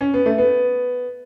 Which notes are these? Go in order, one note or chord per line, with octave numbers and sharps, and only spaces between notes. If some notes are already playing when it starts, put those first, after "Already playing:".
C#4
B3
A3
B3